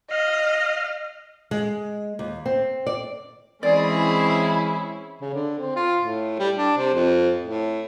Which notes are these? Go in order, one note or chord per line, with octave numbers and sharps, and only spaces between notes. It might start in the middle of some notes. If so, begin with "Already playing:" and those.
D#5 F5 F6
G#3
D#2
C4
D5
E3 G#3 C4 C#4 E4 G#4 D5
C#3
D3
C4
F4
A2
G3
D4
C3
F2
A2